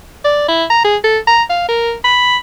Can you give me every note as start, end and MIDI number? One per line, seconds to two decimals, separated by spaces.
0.25 0.45 74
0.48 0.65 64
0.70 0.81 82
0.85 0.97 68
1.04 1.19 69
1.27 1.43 82
1.50 1.66 77
1.69 1.94 70
2.04 2.37 83